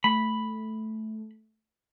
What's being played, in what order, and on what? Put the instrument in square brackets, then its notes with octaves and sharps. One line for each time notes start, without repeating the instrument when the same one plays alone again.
[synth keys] A3 [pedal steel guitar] B5